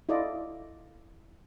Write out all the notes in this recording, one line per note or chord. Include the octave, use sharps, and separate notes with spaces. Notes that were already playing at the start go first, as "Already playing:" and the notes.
E4 F4 A4 D5 D#5